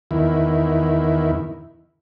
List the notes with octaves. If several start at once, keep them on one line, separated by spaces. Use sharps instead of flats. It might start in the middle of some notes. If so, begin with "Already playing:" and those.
E2 D#3 E4